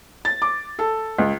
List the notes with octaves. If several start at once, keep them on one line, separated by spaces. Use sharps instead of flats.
A6
D6
A4
C#2